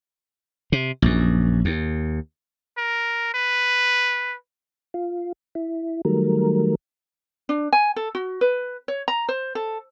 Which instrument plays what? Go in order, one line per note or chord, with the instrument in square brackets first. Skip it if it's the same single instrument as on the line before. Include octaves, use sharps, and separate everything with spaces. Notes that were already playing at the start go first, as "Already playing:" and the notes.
[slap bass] C3
A#1 F#2
D#2
[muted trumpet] A#4
B4
[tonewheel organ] F4
E4
D#3 F#3 G3 A3 A#4
[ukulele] D4
G#5
A4
F#4
B4
C#5
A#5
C5
A4